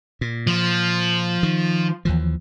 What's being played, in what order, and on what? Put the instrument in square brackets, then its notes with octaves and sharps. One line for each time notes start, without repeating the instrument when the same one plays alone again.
[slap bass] A#2
[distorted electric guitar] F3
[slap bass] D#3
D#2 E3 F3